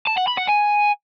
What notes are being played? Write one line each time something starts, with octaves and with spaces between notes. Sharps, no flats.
A5
F#5
B5
F#5
G#5